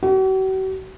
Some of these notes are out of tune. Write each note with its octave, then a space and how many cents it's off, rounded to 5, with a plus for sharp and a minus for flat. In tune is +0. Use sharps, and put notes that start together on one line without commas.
F#4 +45